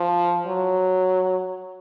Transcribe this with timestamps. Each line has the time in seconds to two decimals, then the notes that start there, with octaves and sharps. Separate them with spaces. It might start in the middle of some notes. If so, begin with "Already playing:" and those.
Already playing: F3
0.47 F#3